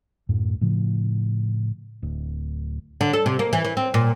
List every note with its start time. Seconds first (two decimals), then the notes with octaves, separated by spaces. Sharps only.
0.29 D1 F#2 A2
0.61 A2 C#3 F3
2.02 D1
3.01 D3
3.13 A4
3.26 C3
3.39 A#3
3.53 E3
3.65 E3
3.77 C4
3.94 A#2